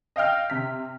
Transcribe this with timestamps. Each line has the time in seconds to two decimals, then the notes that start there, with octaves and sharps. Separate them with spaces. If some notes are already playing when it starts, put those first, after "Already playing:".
0.16 D#5 F5 G5 F6
0.50 C3 B6